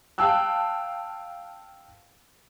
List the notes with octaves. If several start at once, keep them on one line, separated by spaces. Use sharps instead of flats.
F5 G5 A5 E6 F#6